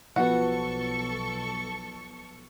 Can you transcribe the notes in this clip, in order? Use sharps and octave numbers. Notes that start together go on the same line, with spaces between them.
B1 F3 B3 F#4 A4 B4 C#6